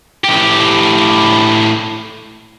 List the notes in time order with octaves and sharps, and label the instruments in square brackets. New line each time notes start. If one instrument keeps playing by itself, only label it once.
[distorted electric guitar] A2 G4